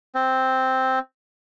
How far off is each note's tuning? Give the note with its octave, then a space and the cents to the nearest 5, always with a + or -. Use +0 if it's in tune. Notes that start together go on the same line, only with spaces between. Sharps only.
C4 +0